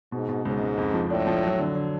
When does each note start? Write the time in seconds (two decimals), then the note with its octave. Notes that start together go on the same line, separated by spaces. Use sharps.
0.12 G#2 B2
0.29 B2
0.45 C#2 G#2
0.62 C#2
0.78 F2
0.94 F3
1.10 A2 D4
1.27 F3
1.43 F#3
1.59 D3
1.75 D3